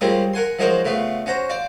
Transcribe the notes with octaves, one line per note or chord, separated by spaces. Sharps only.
G3 G#3 A#3 C4 C#4 F4
A#4 F#5 G#5 C6
F3 F#3 G#3 D#4 A#4 C5
C#3 A3 B3 F4
C#4 F#4 C5 A#5
C5 D5 F5